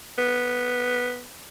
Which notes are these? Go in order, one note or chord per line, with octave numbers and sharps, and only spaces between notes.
B3